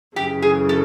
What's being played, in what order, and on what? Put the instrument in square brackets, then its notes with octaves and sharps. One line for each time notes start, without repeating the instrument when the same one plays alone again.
[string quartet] F#2 C#3 E3 [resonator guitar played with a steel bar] G4
[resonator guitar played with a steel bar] G#4
A4